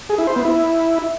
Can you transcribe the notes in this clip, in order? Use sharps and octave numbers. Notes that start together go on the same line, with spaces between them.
G#4
E4
C5
B3
E4